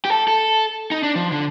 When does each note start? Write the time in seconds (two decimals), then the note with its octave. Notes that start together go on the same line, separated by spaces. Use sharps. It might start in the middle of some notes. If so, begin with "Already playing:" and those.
0.05 G4
0.10 A4
0.28 A4
0.91 D#4
1.03 D4
1.16 F3
1.32 D3